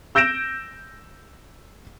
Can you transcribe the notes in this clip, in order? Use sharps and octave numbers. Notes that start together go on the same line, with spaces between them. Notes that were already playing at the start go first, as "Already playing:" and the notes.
E6 G6 A#6 D7 E7